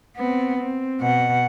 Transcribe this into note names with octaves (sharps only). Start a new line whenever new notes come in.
B3 C4
C4
B2 F#5